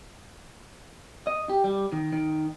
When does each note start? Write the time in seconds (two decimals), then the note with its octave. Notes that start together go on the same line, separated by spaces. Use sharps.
1.27 D#5
1.49 G4
1.64 G3
1.92 D#3
2.13 D#3